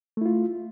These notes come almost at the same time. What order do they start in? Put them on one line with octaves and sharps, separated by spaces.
A3 E4 F4